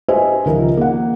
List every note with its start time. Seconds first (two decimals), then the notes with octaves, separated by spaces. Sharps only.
0.08 G4 B4 C5 D#5 E5 G#5
0.45 C#2 D#3 F3 A#4
0.77 A#3 F#5